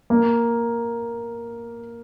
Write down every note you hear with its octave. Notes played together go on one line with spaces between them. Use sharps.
A#3